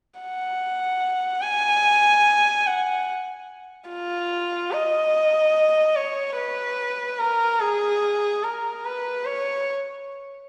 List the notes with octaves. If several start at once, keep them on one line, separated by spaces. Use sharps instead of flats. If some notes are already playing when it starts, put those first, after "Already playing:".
F#5
G#5
F#5
F4
D#5
C#5
B4
A#4
G#4
A#4
B4
C#5